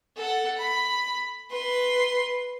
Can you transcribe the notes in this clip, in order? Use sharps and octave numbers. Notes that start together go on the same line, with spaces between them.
A4 F#5
B5
B4 C6